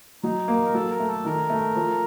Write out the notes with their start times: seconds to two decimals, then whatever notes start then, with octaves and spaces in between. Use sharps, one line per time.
0.23 F#3 D#4
0.48 A#3
0.64 A#4
0.73 F#3 A4
0.91 A#4
1.00 A3
1.08 A4
1.25 D#3 A#4
1.50 A3
1.76 F3